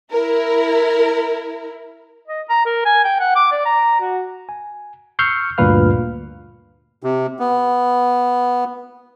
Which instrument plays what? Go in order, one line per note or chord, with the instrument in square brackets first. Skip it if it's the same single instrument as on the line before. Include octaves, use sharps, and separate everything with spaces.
[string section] E4 A#4
[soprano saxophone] D#5
A#5
A#4
G#5
G5
F#5
D6
D5
A#5
F#4
[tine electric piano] G#5
C#6 E6 F6 G6 C7 C#7
D2 G2 A#2 B4 F5 F6
[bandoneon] C3
B3